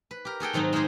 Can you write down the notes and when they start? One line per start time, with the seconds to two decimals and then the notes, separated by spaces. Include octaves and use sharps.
0.11 B4
0.25 G4 A#4
0.40 F#4 G#4 A4 G5
0.53 G#2 D#3 F#3 C4 D#4
0.73 G#3 A#3 D#4 G4 G#4 C5